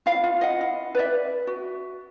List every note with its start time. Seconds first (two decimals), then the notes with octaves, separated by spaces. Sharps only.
0.06 E4 F4 F5
0.24 F4
0.41 D#5 F#5
0.61 E4
0.95 B4 D5 E5
1.47 F#4